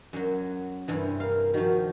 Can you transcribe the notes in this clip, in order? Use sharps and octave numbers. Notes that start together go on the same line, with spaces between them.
F#2 F#3
G2 C3 E3
A#4 F5
D#3 F3 F#4